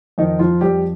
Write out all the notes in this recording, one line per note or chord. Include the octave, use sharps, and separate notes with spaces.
F2 D#3 D#4
F3 F4
F2 G3 G4